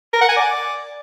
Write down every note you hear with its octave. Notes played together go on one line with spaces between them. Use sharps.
A#4
F#5
G#5
D5